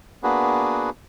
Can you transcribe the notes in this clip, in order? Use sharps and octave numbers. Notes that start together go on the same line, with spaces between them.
A#3 B3 D4 F#4 G#4 B4